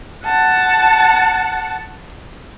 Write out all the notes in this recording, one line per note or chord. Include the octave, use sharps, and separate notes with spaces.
F#5 A5